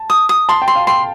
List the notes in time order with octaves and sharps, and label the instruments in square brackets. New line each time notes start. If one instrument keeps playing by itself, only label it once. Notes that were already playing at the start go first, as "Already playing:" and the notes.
Already playing: [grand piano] A5
[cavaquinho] D#6
D#6
[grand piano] A5 [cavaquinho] C6
[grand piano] G5
[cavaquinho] C6
[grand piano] F5
[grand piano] G5 [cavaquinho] C6